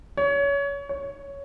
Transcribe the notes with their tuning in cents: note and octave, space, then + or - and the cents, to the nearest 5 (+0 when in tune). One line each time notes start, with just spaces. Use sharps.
C#5 +25
C#5 +5